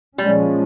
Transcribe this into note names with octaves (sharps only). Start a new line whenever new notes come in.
A#2 F3 G3 G#3 C#4